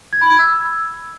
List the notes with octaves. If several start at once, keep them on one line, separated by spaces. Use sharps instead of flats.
G#6
B5
G#6
E6